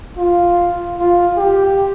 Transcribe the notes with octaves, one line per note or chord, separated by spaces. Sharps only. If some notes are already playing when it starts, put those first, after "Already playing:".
F4
F4
G4